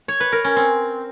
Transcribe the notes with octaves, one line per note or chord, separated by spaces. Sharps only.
C#5
B4
A#4
C#4
C4